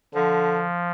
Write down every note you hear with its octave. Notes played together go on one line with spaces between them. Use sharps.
D3 F3